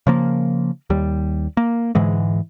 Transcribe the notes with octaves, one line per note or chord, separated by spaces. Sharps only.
C#3 F3 A#3
D#2 G3
A#3
G#2 D3 E3 G#3